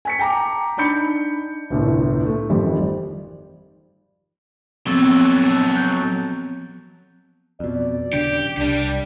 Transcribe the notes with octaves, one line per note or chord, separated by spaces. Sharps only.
G#5 B6 C#7
G5 A5 A#5 D6
D4 D#4 B5 G6 C#7
G1 C2 A2
A3
G#1 F2 G3
F3 F#3 B3 C4 A4
F#6 G6
F2 B2 D5
D#1 C#3 D4 G4
C2 G3 D4 G4